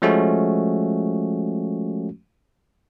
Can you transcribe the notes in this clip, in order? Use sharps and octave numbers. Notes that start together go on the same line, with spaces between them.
F3 G#3 A3 C#4 F#4